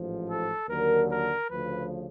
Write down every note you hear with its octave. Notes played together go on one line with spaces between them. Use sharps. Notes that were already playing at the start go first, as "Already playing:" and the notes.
Already playing: A1 G#2 F3
A4
D#2 D3 F#3 A#4
A#4
D2 C#3 F3 B4